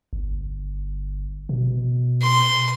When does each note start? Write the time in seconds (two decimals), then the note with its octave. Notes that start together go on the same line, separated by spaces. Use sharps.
0.13 G1
1.49 B2
2.22 C6